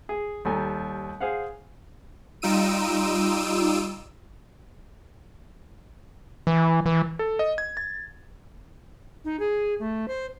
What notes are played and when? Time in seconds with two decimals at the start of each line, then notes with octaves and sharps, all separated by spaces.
0.09 G#4
0.45 D#2 G3 A4 G#5 A#5
1.20 G#4 C5 F5 F#5
2.42 G3 D#4 F4 E6 D7 D#7
6.47 E3
6.86 E3
7.19 A4
7.39 D#5
7.58 G#6
7.77 A6
9.25 D#4
9.40 G#4
9.79 A3
10.08 C5